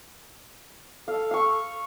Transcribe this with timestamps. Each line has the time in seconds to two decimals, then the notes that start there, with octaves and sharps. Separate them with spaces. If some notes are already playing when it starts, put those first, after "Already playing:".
1.08 A4 F5
1.31 F5 C#6